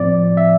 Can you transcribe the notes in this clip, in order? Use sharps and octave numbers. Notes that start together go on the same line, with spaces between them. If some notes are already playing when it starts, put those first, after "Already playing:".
Already playing: A2 F3 C4 D5
E5